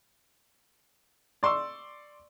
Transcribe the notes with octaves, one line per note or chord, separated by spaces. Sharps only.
D5 C6 C#6 E6